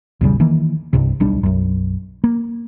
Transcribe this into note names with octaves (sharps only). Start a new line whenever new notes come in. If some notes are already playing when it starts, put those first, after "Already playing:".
A#1 E2 C#3 G3
D#3 E3 A#3
C2 G2 C3
D1 B1 G3 D4
B1 F#2
A#3